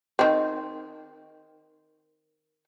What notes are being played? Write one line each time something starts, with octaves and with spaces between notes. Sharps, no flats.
D#3 C4